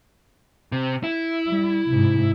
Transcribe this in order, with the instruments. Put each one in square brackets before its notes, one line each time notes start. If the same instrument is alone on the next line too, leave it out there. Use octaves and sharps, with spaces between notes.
[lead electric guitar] C3
E4
[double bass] G3
G#2 C3